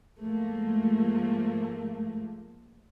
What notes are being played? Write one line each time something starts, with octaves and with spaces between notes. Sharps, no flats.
G#2 F3 A3 A#3